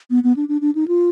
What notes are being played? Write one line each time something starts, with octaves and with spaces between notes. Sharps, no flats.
B3
B3
D4
D4
D4
D#4
F4